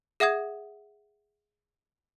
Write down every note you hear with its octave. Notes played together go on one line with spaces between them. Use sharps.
G#4 E5 F#5 D#6 G#6